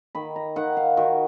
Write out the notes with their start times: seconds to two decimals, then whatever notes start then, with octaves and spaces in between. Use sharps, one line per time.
0.15 D#3 B5
0.36 A#5
0.56 D#3 F#5
0.77 F5
0.97 D#3 F#4